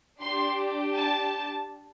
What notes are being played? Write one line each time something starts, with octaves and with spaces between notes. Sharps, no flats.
D4 G4 C6
A5